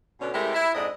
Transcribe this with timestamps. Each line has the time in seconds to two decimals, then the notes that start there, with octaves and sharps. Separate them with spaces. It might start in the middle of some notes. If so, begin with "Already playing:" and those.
0.21 B2 D3 C#4
0.34 C3 G#3 A3 E4 G4 A#4
0.54 E4
0.74 F2 G#2 D4 D#5